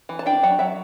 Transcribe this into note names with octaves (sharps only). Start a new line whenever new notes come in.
E3
A5
D4 G5
F#3 F#5
F#3 E5